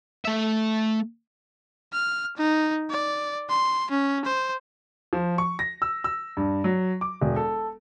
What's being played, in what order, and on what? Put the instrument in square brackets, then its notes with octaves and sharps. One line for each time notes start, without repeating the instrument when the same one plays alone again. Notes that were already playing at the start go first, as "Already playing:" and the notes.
[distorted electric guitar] A3 E5
[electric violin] F6
D#4
D5
C6
C#4
C5
[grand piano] F3
C#6
A#6
E6
E6
G2
F#3
D6
E1
A4